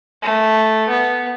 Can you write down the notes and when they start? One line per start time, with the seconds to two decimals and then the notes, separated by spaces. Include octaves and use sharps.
0.22 A3
0.89 B3